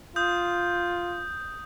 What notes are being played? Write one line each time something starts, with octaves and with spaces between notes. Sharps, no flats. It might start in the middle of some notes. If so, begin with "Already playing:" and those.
F4 D#6 G6